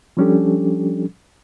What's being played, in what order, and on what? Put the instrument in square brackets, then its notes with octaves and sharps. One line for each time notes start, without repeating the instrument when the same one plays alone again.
[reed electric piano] F3 G3 C#4 D4 G4 A4